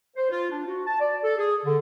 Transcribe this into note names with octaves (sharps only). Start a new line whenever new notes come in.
C5
F4
D4
F#4
A5
D5
A4
G#4
D3